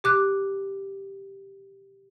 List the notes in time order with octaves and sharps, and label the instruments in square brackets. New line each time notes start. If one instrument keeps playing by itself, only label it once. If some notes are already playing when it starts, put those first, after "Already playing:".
[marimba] G4 D6 F#6